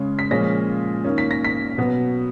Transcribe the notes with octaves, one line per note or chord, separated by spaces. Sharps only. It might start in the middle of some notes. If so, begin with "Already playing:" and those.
Already playing: C#3 G#3 C#4
B6
A#2 F3 G#3 C#4 A#6
D#3 A#3 C#4
B6
A#6
B6
B2 F#3 B3